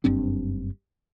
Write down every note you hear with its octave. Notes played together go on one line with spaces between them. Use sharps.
F#1 G2 C4 D4